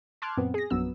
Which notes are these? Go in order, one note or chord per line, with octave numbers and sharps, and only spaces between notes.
A5 C6 D6 F6 F#6 G#6
F#2 A#2 B3 C4
G#4 A#6
A#1 F#2 F#3 B3 E6